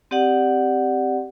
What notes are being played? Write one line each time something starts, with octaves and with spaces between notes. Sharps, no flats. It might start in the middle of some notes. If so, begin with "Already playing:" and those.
C4 G4 D5 F#5